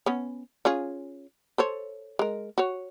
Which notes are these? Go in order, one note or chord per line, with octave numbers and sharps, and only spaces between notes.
B3 C#4
C#4 F4 G#4
A4 C5 C#5
G#3 A#4
F#4 C#5